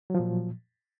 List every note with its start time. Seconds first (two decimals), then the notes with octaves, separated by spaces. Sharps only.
0.10 F#3
0.15 F3
0.19 A#2